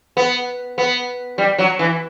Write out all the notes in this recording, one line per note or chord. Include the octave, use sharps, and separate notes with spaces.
B3
B3
G3
F#3
E3